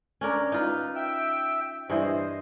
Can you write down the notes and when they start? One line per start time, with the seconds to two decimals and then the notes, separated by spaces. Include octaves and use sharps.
0.21 C#4 D4 A#4
0.52 D#4 F4 B4
0.96 E5 G5 E6
1.90 G2 E3 C5 D#5